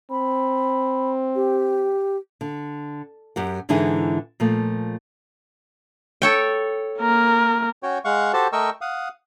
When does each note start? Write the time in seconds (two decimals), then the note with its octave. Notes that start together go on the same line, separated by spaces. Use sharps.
0.11 C4 B5
1.35 G4
2.41 D3
3.36 F#2 G4 F#5
3.69 G#2 D3 E3 D#4 E4 G#4
4.40 A#2 F3 A3
6.22 A4 C#5 G5
6.99 A#3 A#4
7.83 C#4 F#4 C#5 G5
8.05 G#3 F5 F#5 C#6
8.33 F#4 G4 A4 C5 A5
8.53 A3 A#4 D#5 G5 C#6 E6
8.81 F5 F#5 D#6